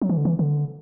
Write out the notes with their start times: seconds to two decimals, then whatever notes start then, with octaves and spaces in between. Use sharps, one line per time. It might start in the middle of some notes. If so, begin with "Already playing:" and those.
0.02 F#3
0.09 E3
0.17 D3
0.25 E3
0.39 D3